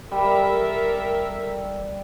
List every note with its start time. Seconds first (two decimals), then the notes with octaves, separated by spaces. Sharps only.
0.12 G3 A4 A#4 E5